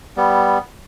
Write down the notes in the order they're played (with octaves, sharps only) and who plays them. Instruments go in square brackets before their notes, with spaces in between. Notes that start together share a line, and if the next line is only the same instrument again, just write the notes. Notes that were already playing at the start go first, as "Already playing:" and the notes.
[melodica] G3 B3